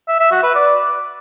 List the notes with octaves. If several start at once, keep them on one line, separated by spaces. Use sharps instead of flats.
E5
E5
F#4
B4
D5